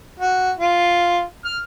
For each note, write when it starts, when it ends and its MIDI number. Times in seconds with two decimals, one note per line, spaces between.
0.20 0.51 66
0.58 1.23 65
1.45 1.58 89